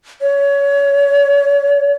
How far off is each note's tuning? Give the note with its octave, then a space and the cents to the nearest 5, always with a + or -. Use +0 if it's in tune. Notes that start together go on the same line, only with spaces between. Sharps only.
C#5 +25